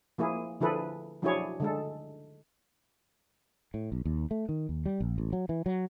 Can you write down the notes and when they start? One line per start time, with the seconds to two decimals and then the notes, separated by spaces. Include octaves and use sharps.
0.18 F3 A#3 E4 G#4
0.61 D3 F3 E4 G#4 A4 B4
1.22 F3 F#3 D4 E4 G#4 C#5
1.60 D3 G#3 A4
3.74 A2
3.92 B1
4.05 D#2
4.31 A3
4.49 D#3
4.69 D#2
4.86 G3
5.00 A#1
5.18 A1
5.33 F#3
5.49 E3
5.66 F#3